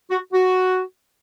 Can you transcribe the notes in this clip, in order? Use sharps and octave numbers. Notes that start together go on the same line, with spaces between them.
F#4
F#4